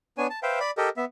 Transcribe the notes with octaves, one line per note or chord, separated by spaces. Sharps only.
B3 D4 C#5 G#5
A5
B4 C5 E5 F5 G5
D5 B5
G4 A4 A#4 D#5
B3 E5